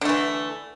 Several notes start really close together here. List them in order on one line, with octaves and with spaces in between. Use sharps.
D3 A3 E3